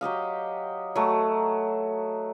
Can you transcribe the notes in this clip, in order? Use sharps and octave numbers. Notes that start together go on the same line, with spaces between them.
F#3 G4 D#5 F5
F#3 A3